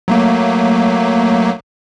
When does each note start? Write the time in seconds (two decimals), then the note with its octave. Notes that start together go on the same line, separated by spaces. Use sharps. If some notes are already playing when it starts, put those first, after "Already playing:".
0.08 F#3 A3 A#3